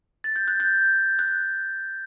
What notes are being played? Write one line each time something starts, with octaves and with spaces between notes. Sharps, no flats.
A6
G6
F#6
G6
F#6